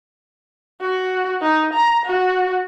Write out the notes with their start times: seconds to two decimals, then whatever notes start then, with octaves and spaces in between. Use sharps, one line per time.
0.81 F#4
1.41 D#4
1.74 A#5
2.06 F#4